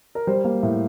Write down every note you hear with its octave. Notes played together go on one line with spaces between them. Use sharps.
A#4
G3 C5
A#3
A2